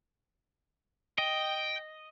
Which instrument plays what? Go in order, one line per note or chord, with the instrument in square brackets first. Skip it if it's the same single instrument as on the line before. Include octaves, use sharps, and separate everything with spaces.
[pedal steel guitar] D#5 [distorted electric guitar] G5